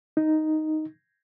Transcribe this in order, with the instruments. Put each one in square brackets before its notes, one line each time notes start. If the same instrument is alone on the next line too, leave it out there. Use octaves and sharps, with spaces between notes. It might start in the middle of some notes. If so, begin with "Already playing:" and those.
[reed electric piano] D#4